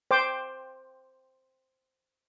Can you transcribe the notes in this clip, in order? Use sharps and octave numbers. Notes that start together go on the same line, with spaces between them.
C5 G5 D6